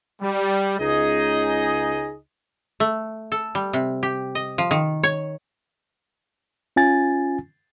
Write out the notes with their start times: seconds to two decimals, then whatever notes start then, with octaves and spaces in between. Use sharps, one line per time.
0.22 G3
0.79 C#2 D#4 G#4 D#5
2.80 A3
3.32 A4
3.55 G3
3.73 C3
4.03 G4
4.35 D#5
4.58 F3
4.71 D#3
5.03 C#5
6.76 C#4 F4 G#5 A6